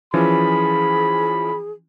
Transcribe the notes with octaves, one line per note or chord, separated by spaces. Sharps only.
E3 F3 C#4 G#4 B5